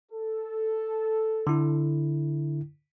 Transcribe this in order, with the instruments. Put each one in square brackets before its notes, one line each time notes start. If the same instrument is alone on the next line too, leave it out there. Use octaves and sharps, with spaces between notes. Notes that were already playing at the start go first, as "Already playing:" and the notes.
[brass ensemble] A4
[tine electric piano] D3 E4